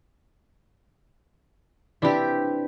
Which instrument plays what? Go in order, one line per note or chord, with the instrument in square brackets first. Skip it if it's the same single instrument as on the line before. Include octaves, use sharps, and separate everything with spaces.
[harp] C4 D4 B4 [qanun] E4 G4